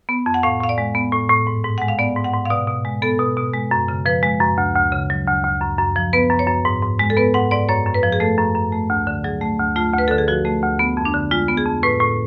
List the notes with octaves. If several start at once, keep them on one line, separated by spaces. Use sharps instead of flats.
B3
F2
F#5
A2 F5
A2 F5
D5
G#3
B3
A2
A2
G#2
G#2
G#3 F#5
F5
B3 D5
G#2
F#5
G#2
F5
B2 D5
B2
G#3
B3 A4
B2
B2
G#3
F#2
C#3
F3 B4
G#3
F#2
D2
D2
C#3
F#3
D2
D2
F#2
F#2
F3
B3 B4
F#2
C#5
F#2
G#2
G#2
G#3
A4
B3 B4
G#2 F#5
G#2 D5
F#2 C#5
F#2
B4
F3
G#4
A3 A4
F#2
F#2
A3
D2
D3
F#3 G#4
A3
D2
A3 F4
D2
B4
D3 A4
G#4
F3 F#4
A3
D2
B3
F2
D4
D3
G#3 F4
B3
G#4
F2
A2 B4
A2